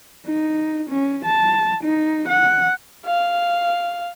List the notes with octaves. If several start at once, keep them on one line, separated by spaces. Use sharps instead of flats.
D#4
C#4
A5
D#4
F#5
F5